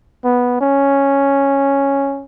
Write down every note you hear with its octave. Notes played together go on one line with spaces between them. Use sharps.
B3
C#4